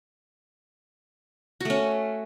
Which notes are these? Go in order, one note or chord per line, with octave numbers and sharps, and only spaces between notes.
A3 C#4 F#4